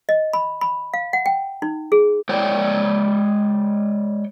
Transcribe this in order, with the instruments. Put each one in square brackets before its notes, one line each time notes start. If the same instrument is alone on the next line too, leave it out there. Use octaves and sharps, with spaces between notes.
[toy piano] D#5
B5
B5
F5
F#5
G5
D#4
G#4
[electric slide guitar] G#3 C#5 D5 G5